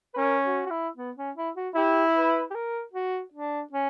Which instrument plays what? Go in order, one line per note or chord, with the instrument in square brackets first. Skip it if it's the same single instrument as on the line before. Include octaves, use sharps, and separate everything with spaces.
[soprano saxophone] B4
[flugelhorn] C#4 [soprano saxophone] A#4
[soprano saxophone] F#4
F#4
E4
B3
C#4
E4
F#4
[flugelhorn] E4 [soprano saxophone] G4
[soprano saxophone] B4
G4
A#4
F#4
D4
C#4